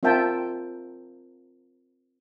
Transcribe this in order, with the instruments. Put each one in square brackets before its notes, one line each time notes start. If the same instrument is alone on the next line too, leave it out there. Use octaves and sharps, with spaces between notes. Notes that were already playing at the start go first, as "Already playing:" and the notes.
[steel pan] C4 F4 A#4 E5 G5 A5